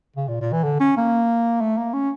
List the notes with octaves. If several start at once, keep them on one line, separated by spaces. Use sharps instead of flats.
C#3
A#2
A#2
E3
D3
C#4
A#3
A3
A#3
C#4